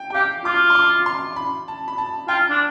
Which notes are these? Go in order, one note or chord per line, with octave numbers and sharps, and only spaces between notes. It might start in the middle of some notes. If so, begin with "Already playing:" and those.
Already playing: G5
G5
G4 F5
F4 D6
C6
D6
C6
B5
A5
B5
A5
F4 G5
D4